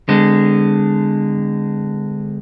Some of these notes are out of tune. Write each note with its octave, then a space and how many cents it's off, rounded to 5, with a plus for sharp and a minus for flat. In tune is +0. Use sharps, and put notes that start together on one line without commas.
D3 +0 G#3 -20 B3 +45